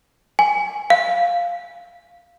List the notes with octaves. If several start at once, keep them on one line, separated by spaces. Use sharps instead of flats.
G#5
F5